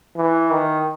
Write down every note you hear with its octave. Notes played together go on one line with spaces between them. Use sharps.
E3
D#3